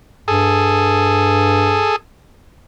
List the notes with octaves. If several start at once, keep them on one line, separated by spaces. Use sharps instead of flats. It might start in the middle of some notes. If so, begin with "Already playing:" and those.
G2 G#4 A4